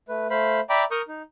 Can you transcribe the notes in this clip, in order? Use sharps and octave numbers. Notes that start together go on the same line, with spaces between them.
A3 B4
A3 C5 F5 B5
D5 E5 G5 A#5 B5 D6
A#4 A#5 C#6 D#6 G6
D#4